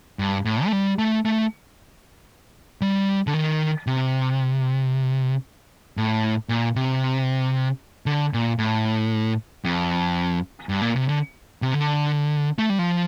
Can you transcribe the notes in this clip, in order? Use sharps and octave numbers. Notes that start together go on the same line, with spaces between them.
G2
A2
A3
G3
A3
A3
G3
D3
D#3
C3
A2
A#2
C3
D3
A#2
A2
F2
G2
A#2
C3
D3
C3
D3
A3
G3
F3